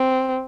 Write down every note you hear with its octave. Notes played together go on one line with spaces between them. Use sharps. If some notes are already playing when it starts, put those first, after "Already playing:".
Already playing: C4